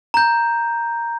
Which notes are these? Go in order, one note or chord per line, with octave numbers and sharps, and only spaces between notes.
A#5 G6